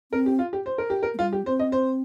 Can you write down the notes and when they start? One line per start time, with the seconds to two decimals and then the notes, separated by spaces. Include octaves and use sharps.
0.12 C4 A#4
0.26 G4
0.39 F4
0.53 G4
0.66 C5
0.78 A#4
0.90 G4
1.03 A#4
1.14 A#3
1.19 G3 F4
1.33 G4
1.46 C4 C5
1.59 D#5
1.72 C5